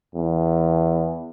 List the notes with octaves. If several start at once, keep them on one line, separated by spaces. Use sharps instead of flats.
E2